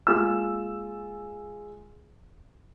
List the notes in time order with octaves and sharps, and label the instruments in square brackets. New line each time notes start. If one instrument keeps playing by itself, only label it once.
[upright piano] G#3 A#3 F4 E6